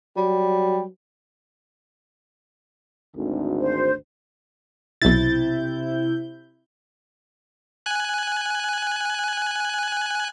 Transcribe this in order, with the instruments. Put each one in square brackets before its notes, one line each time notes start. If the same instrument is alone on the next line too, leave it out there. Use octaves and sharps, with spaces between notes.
[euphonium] F#3 [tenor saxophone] G3
[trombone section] G#1 D2
[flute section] C5
[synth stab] B1 A6 [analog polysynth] C3 E4 G6
[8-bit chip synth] G#5 F#6